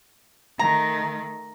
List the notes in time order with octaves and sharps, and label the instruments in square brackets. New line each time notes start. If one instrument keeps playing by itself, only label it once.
[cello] D#3 A3 [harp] A#5